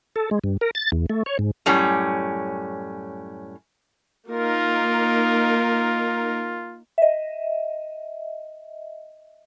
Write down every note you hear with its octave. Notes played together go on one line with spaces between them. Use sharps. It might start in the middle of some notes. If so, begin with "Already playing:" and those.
A4
G#3
G2
A#4
A6
E2
A3
C#5
G#2
F#2 A2 G3 C#4
A#3 D#4 F4 A#4
D#5 E5